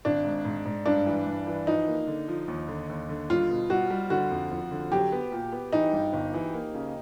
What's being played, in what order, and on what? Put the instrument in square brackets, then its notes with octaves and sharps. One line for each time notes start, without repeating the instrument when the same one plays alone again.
[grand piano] G#1 [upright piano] D4
[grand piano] G#2
G#2
G#2
[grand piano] G2 [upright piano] D4
[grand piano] E3
G2
E3
[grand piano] F3 [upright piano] D#4
[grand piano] A#3
D3
F3
D#2
D3
D#2
D3
[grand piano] G3 [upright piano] F4
[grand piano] B2
[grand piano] G3 [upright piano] F#4
[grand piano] G3
[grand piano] D3 [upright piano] F#4
[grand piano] F2
F2
D3
[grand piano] F#3 [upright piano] G4
[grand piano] B3
A#2
B3
[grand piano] E3 [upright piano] D#4
[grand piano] G2
G1
E3
A#3
C#3